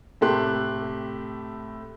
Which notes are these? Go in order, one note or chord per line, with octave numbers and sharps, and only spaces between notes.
A2 C3 A3 G4 C6 F#6